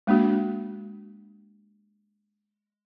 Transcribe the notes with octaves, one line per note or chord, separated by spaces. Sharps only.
G#3 A#3 D4 F#4